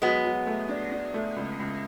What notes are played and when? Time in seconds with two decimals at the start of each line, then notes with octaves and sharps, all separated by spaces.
0.02 F#3 G#3 B3
0.24 F#3
0.47 A3
0.69 D4
0.92 D4
1.14 A3
1.36 C#2
1.59 C#2